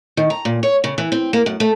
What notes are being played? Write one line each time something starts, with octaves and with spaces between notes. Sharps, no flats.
D#3
A#5
A#2
C#5
C#3
E3
C4
A#3
F#2
A3